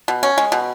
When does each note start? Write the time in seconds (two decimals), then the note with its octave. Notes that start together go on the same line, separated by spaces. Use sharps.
0.08 B2
0.23 C#4
0.38 G#3
0.52 B2